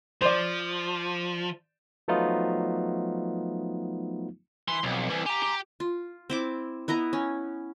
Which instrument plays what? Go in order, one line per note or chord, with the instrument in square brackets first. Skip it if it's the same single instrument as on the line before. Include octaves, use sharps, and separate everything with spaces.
[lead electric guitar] F3 [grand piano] C5 D5
[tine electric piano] F3 F#3 A3 B3 D#4 F4
[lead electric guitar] E3 [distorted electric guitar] C6
[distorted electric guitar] B1 [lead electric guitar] F2
[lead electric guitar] C2 [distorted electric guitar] E3
[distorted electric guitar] G4 [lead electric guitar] G#5 A#5
[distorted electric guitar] G4
[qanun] F4
C4 E4 D6
B3 E4 D#5 A#5
C#4